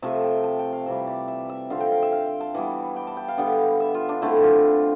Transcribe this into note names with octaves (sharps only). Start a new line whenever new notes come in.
C3 F3 A3 E5
G5
A5
G5
F5
C3 E3 G3 E5
D5
E5
E5
D3 F3 C4 F5
G5
F5
E5
F5
G5
A5
E3 G3 B3
G5
A5
G5
F5
D3 G3 B3
E5
F4
D4
D3 A3 C4 E4
F4